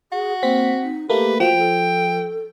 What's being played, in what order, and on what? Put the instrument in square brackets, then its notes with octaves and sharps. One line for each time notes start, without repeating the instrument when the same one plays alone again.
[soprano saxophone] F#4 [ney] G#4
[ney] A#3 [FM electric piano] C4 B6
[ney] D#4
[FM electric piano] A3 A#3 [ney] G4 [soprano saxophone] B4
[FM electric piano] F3 [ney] F#4 [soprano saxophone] G5
[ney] A4